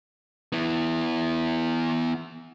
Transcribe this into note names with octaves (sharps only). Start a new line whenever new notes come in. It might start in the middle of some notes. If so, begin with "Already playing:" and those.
B3 E4